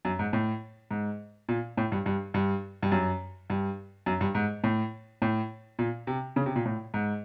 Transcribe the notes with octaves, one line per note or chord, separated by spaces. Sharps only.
F#2
G#2
A2
G#2
A#2
A2
G2
G2
G2
G2
F#2
G2
F#2
G2
G#2
A2
A2
A#2
C3
C#3
C3
A#2
A2
G#2